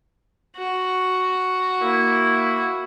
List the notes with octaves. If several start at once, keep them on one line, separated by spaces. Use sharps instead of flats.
F#4
A#3 E4